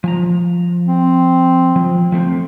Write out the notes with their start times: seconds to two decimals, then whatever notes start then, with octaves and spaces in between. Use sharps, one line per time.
0.04 F3 G#5 A#5
0.87 C4
1.76 F3
2.12 F3 A3 C4